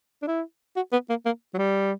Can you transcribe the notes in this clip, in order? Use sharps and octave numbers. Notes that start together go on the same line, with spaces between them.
D4
E4
F#4
B3
A#3
A#3
F#3
G3